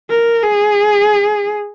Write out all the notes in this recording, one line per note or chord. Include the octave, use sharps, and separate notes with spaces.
A#4
G#4